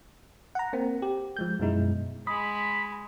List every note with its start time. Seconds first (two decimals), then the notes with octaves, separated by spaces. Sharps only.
0.55 F#5 A#5
0.73 A#3 C4
1.02 G4
1.37 F3 G#3 G6
1.60 F#2 B2 G#3 D#4 E4
2.27 G#3 B5 D#6